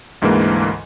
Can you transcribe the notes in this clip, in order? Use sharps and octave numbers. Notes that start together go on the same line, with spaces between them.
D2 G#2 D3 E3 G#3 A#3